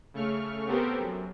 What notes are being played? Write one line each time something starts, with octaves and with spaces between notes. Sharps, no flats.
C#3 A3 C#6 F6
B3 C4 G4 A4 A#4 C5
F#2